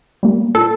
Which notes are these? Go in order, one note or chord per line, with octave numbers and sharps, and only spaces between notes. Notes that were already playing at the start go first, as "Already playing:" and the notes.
G3 A#3
A#2 A4